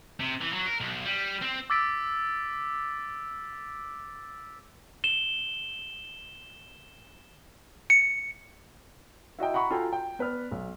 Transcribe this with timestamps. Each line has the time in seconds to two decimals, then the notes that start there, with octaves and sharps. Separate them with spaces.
0.20 C3
0.41 E3
0.53 F#3
0.67 A#4
0.80 B1
1.06 G3
1.42 C4
1.70 D6 E6 A6 B6 D7
5.04 E7 G7
7.90 C#7
9.39 E4 F#4 D#5 G5
9.54 F#5 A#5 B5 C#6
9.71 F4 F#4 A4 G5 G#5 A#5
9.93 G5
10.19 B3 B4 D5 F6
10.51 B1